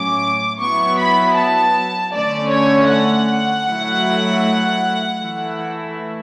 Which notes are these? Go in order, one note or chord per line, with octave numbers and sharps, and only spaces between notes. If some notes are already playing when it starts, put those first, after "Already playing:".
Already playing: A2 F#3 C#4 D6
F#3 B3 E4 C#6
B5
A5
D3 A3 C#4 D5
C#5
F#5
F#3 A3 E4
E3 A3 E4